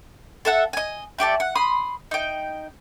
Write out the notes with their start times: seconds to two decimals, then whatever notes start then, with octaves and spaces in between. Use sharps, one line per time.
0.45 A4 E5 F#5
0.73 D#5 G#5
1.19 A3 G4 D5 A5
1.40 F#5
1.55 B5 C6 D#6
2.11 D#4 G5